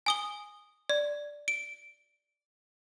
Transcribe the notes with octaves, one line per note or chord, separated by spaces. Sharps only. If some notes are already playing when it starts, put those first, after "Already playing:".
G#5 D#6 G7
D5
D7